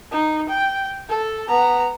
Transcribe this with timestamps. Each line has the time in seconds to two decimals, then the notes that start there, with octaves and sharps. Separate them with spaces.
0.11 D#4
0.48 G5
1.09 A4
1.48 B3 A#5